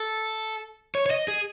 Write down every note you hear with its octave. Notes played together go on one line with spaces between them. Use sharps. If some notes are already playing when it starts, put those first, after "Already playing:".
Already playing: A4
C#5
C#5
D#5
G#4